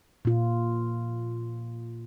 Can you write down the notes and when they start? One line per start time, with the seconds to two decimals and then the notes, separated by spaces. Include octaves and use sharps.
0.25 A#2 F4